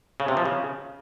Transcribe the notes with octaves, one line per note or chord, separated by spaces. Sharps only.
C#3
C3
F3
C#3